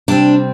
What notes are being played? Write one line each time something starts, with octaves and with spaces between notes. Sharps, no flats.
C3 G3 C4 D4